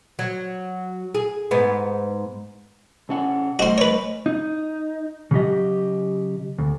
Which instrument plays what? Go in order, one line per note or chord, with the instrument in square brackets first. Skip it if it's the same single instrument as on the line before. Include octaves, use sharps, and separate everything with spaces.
[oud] F#3
G#4
G#2 B3
[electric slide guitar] C3 C#4 F#5
[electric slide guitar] A3 C5 D#5 [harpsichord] F#4 C6
[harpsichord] B4 C#5
[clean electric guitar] D#4
C#3 F#3 G4 D#5
D2